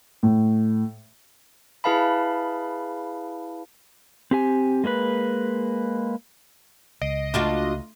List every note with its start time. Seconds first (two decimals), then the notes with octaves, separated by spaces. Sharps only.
0.23 A2
1.84 E4 G#4 B4 F5 A5 B5
4.31 C4 G4 G#5
4.84 G#3 A#3 D4 B4
7.02 C#2 D#5 C7 D7
7.34 A3 D4 F4 F#4 C6